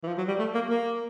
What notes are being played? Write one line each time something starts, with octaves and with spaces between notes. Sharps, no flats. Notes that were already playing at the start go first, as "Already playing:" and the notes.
E3
F3
F#3
G3
A3
A#3
A#3